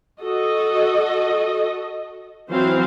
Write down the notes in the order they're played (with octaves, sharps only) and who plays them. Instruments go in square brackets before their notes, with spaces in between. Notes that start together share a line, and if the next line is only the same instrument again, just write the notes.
[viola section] F#4 A4 D#5
E3 F#3 C4 C5 F5